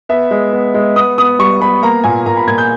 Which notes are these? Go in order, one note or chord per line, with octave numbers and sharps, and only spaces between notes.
B3 E5
G#3
B3
G#3
B3 D#6
B3 D#6
G3 C#6
B3 B5
A#3 A#5
A#2 G#5
A#2 A#5
B5
A#2 G#6
G6